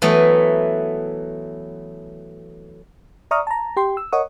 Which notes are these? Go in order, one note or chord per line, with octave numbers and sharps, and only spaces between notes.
E3 F#3 A3 B3
D5 E5 A#5 C#6 D#6 F6
A5 A#5
G4 G5 C6
E6
A#4 C#5 D#5 F#5 C#6 D#6